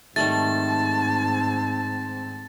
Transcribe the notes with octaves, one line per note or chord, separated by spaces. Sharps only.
G#2 D#3 G3 A3 C4 A5 A6